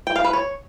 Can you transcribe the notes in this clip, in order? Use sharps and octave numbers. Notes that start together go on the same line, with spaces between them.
G5
F5
B4
C#5